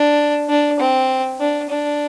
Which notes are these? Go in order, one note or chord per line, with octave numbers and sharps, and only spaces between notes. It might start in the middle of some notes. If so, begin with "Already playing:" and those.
Already playing: D4
D4
C4
D4
D4